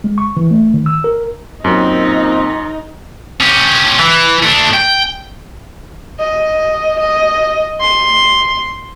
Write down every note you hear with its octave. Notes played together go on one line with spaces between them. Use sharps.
G#3
C#6
E3
A3
D#3
E6
A#4
F#2 A#2 C4 D#4
C#4 G4
E3
A3 D4
G5
D#5
D#5
C6